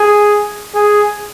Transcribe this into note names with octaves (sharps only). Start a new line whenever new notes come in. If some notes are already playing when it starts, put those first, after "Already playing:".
Already playing: G#4
G#4